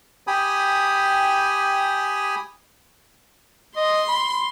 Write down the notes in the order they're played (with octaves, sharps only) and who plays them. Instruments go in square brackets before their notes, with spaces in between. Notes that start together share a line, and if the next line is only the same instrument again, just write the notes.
[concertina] G4 G5 G#5 B5 D#6
[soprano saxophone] D#5 [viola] C6
[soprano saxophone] B5